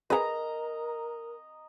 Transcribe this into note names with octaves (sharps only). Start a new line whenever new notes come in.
G#4 A#4 B4 D#5 A#5